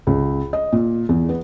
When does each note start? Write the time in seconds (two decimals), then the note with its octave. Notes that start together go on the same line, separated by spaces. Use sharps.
0.07 C#2
0.53 D#5
0.73 A#2
1.09 E2
1.29 B3